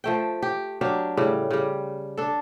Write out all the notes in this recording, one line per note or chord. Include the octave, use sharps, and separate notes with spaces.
F3 A3 G5
G4
F#3 D4 G4 F5
A2 C#3 G3
C#3 G3
D4 A4